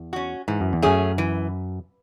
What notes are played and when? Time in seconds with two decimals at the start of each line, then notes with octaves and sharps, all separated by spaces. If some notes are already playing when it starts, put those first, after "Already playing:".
Already playing: E2
0.13 C#4 F#4
0.48 G#2 E3
0.61 F#2
0.73 E2
0.82 F#2 A3 C#4 G#4
1.18 E3